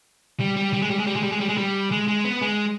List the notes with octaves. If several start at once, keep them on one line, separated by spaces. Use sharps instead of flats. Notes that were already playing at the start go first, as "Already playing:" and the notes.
G3
G3
G3
G#3
G3
G#3
G3
G#3
G3
G#3
G3
G#3
G3
G#3
G#3
B3
G#3